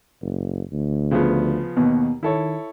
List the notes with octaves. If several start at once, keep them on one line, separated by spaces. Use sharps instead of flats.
F#1
D2
C#3 F3 B3
D#2 B2 B3
D#3 E4 A4 C#5